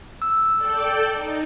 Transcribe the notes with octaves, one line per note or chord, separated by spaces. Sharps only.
E6
A4 D5 G5
D#4